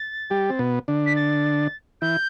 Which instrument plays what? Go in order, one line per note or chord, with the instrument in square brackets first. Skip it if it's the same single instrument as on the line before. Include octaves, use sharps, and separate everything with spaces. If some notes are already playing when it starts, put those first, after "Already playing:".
Already playing: [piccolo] A6
[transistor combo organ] G3 G4
C4
B2 B3
D3 D4
[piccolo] B6
A6
[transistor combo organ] E3 E4 [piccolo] G6